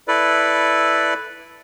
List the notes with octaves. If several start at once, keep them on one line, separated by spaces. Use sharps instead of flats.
E4 A4 B4 D5